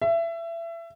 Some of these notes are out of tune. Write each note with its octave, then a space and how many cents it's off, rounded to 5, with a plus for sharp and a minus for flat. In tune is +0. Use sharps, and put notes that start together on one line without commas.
E5 +25